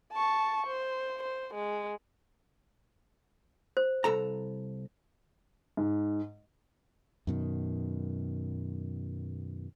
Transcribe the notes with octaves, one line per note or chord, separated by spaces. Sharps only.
A5 C#6
C5
C5
G#3
C5
C2 A4 A#5
G#2
F#2 B2 D#3